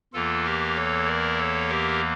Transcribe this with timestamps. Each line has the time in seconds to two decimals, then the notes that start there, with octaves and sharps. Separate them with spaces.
0.13 E2 E3 A#3 F4 A4
0.45 G4 A#4
0.75 A4 C#5
1.07 A#4 D5
1.38 A4 C#5
1.68 G4 A#4